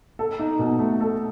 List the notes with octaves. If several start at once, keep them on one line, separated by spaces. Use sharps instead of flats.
A4
D#4
B2
A3
A4